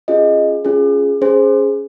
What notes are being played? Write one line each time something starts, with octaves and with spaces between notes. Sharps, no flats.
C#4 F4 G#4 D#5
C#4 F4 G#4
C#4 G#4 C5